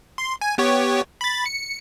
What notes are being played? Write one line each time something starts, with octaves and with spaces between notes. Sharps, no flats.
C6
G#5
B3 G4 C#5
B5 A6
C#7